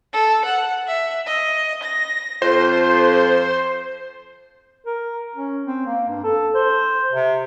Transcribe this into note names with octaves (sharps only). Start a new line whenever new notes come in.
A4
F#5
E5
D#5
A#6
F2 C5
A#4
C#4
C4
A#3
G2
A4
C5
C3